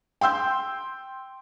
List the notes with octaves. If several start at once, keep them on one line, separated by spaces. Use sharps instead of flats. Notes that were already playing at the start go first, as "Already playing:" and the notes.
G5 C6 E6 G6